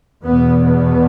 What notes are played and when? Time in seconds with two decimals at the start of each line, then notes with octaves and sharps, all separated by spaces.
0.24 E2 B2 B3
0.65 B3